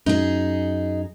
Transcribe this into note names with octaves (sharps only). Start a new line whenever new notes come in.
F#2 D#4 G#4